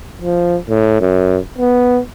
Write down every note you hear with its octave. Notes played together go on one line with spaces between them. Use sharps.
F3
A2
F#2
B3